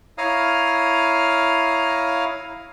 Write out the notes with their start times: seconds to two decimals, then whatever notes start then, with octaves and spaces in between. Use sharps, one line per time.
0.18 E4 C#5 F5 A#5 D#6 F6